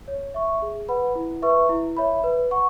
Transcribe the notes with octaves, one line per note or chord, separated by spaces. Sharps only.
C#5
E5 C#6
G#4
B4 F#5 B5
E4
B4 E5 C#6
E4
C#5 E5 B5
B4
F#5 C#6